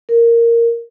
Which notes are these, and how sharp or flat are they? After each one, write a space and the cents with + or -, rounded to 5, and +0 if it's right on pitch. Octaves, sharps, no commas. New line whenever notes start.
A#4 -5